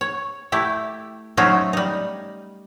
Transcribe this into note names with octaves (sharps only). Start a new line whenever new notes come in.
C#5
A3 E4 G4
F#3 A3 C4 C#4 D#4 F4
G3 D#4